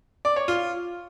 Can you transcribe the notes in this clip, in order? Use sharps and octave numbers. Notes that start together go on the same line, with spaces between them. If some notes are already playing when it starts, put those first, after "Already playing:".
D5
C#5
F4